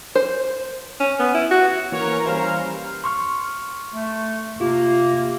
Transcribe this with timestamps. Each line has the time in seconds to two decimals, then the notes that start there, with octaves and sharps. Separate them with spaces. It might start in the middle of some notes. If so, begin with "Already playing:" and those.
0.15 C5
1.00 C#4
1.20 B3
1.34 E4
1.51 F#4
1.92 E3 A#3 C#4 A#4 C#5 A#5
2.26 G3 C5 F5
3.04 C6 C#6 F6
3.94 A3
4.60 C3 A#3 F4 G4